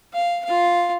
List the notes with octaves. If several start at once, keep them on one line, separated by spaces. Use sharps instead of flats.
F5
F4 F5